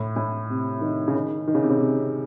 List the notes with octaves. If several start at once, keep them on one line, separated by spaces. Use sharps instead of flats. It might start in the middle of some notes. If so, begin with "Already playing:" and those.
Already playing: A2
A2
C3
D#3
C#3
D#3
D#3
C#3
C3
C#3
C3